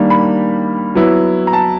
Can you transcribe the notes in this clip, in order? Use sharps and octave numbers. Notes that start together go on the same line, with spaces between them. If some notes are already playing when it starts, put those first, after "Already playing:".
Already playing: D#3 G3 A#3 D4
B5
F#3 B3 E4
A#5
A5